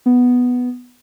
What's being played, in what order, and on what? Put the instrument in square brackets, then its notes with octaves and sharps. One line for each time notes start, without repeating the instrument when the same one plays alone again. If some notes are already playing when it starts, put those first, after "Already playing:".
[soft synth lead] B3